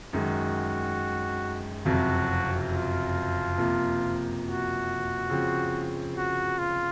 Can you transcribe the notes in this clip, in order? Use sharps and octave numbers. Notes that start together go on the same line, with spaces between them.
F#2 D#3 G#3 F#4
F#1 F2 C3 F#3 F#4
F4
C3 F3 A#3
F#4
C#3 F3 C4
F#4
F4